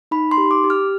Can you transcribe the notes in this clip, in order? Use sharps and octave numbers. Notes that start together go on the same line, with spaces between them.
D#4 B5
C6
G4
D6
G4
F6